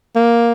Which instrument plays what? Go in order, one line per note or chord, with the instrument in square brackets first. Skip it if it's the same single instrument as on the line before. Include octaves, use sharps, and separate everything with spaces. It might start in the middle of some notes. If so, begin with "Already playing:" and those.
[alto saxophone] A#3